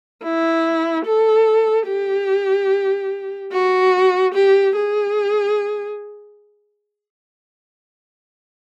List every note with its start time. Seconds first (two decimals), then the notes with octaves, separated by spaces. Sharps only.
0.23 E4
1.05 A4
1.88 G4
3.52 F#4
4.34 G4
4.76 G#4